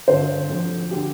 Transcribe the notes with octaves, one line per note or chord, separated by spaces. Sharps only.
G1 G2 D3 C5
F1 F2 D3
D3 G4